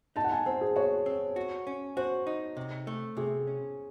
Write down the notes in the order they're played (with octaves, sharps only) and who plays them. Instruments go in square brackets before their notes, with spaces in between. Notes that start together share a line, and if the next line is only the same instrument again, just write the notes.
[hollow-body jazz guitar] D#4 [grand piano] A5
[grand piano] F#5
G#5
[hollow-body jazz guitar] C4 [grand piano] C5
[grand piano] G#4
[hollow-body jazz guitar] F#4 [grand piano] C#5
[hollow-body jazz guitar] C4
F#4
C#4
[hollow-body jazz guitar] F#4 [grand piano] C5
[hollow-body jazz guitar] D#4
C3
A3
[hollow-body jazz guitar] C3 [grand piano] G#4
[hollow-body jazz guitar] C#4